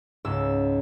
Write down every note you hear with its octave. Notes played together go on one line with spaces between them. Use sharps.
C#2 G#2 E6